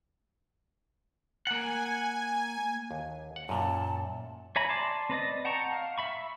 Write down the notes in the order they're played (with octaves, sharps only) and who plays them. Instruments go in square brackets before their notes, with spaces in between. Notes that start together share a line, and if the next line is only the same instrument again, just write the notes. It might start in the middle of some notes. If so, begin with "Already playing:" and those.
[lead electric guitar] A#3 F#5 [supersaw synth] G#5
[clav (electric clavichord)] D#2
F#5
[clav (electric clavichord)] F#2 A#2 [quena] A5
[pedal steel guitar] C#5 E5 G#5 A#5 B5
D5 A5 C6 D6
C4 B4 D5 D#5
F#5 G5 A5 A#5 C#6
F5
E5 B5 C#6